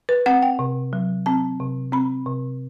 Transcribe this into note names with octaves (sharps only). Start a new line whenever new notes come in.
B4
C4 F#5
G5
C3
F#3
C4 A5
C3
C4 B5
C3